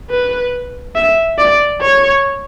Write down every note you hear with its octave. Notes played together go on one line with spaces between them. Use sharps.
B4
E5
D5
C#5